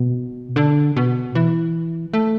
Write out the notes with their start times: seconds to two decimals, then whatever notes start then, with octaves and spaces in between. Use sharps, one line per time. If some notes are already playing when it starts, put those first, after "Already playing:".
Already playing: B2
0.56 D3
0.96 B2
1.35 E3
2.13 A3